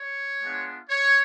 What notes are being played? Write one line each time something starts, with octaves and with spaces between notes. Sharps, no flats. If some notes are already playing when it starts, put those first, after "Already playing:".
Already playing: C#5
G#3 B3 D4 F4
C#5